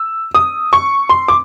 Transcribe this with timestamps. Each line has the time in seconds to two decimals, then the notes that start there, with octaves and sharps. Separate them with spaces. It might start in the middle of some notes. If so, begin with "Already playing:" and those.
Already playing: E6
0.35 D#6
0.73 C#6
1.09 C6
1.28 D6